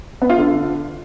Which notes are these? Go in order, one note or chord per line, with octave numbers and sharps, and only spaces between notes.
B3
F4
D3